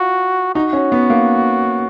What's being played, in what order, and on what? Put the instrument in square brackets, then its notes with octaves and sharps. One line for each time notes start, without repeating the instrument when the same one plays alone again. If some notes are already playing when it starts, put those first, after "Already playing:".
Already playing: [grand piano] F4 [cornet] F#4
[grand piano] D#4 [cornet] F#4
[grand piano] C#4
B3
A#3